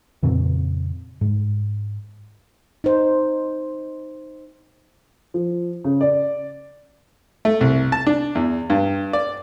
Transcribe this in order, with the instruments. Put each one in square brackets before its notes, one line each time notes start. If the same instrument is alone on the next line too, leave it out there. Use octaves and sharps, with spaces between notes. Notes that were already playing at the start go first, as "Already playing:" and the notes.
[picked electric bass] F2 A#2 C#3 C4
G#2
[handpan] D#4 C5
[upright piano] F3
C#3
D5
[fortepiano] A3
C2
A5
D4
E2
G2
D5